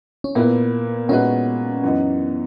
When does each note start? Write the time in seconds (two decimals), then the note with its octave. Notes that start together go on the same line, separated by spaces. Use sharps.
0.24 C#4
0.35 A#2 A#3 B3 E4 B4
1.09 A#2 G#3 C#4 D#4 F#4 B4
1.83 F#2 E3 B3 D#4